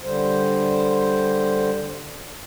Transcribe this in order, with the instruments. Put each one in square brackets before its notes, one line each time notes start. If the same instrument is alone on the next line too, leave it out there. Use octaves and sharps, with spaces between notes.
[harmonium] D3 G3 C5